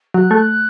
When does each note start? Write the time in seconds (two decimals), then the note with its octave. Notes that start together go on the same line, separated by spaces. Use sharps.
0.14 F#3 F#6
0.31 A3